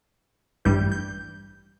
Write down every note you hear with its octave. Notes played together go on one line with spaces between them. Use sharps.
A1 G2 E3 G3 G6
G6